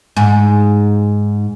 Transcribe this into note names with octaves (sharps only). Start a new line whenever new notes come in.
G#2